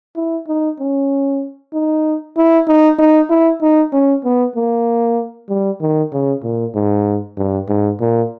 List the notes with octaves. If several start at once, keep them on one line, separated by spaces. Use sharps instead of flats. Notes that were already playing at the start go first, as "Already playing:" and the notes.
E4
D#4
C#4
D#4
E4
D#4
D#4
E4
D#4
C#4
B3
A#3
G3
D#3
C#3
A#2
G#2
G2
G#2
A#2